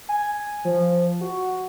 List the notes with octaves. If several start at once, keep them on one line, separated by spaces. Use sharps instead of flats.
G#5
F3
F#4